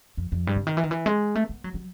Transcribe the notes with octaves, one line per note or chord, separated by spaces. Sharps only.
F2
F2
G2
C#3
D#3
E3
D#3
E3
G#3
A3
B3
F#3
F#3